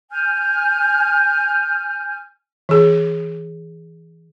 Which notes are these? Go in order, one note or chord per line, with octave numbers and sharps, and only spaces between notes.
G#5 F6 G6
E3 G#4